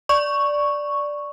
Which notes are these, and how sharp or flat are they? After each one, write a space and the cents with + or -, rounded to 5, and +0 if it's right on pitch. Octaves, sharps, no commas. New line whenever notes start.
D5 +0 C#6 +0